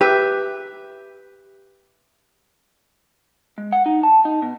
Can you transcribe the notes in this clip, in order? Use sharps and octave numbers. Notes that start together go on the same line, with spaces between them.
G4 B4 E5
G#3
F#5
D#4
A5
D#4
B2